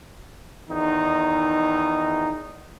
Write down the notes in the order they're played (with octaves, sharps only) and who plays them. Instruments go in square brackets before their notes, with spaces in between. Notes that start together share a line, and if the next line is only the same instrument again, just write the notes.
[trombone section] E2 D#3 D#4